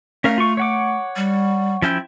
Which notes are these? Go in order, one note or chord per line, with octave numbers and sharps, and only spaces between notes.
A3 C#4 A#4 F5
F4 C#6
C#5 F#5 D6
G3
F3 C#4 E4 G5